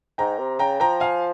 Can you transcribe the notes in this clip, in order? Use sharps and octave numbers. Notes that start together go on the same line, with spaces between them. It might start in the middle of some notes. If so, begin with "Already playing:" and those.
G#2 G5 A#5
C3
C#3 G5 A#5
F3 G5 A#5
F5 G#5